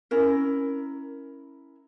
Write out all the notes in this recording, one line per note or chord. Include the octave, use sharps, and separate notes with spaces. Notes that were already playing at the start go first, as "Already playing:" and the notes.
C#4 E4 A#4